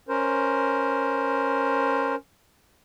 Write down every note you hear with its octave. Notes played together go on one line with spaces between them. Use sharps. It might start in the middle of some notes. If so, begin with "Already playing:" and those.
C#4 A#4 C5